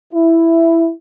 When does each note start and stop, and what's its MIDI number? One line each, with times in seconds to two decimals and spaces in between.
0.13 0.92 64